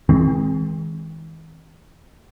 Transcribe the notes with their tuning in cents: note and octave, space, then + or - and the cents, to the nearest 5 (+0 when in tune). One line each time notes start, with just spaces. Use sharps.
E3 -45 G#3 +0 C4 +10